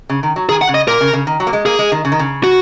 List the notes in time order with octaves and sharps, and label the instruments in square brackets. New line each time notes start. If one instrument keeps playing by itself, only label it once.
[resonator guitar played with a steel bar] C#3
D#3
F#3
[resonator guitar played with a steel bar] D#3 [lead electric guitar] G#4
[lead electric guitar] F#5
[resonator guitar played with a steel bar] C#3
[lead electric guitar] D#5
[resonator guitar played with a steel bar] A#2 [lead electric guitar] A#4
[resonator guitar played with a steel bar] C#3
C#3
D#3
F#3
A#3
G#3
[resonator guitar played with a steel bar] A#3 [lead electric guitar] G#4
[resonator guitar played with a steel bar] G#3
D#3
C#3
D#3
C#3
[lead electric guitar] F#4